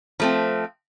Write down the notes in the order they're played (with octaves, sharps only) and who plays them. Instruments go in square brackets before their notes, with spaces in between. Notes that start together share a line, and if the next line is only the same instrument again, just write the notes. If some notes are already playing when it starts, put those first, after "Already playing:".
[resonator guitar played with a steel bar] F3 A3 C4